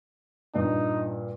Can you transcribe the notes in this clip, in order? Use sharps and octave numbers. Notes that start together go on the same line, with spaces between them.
G2 A#2 D#4